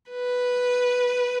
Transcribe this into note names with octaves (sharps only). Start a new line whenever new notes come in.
B4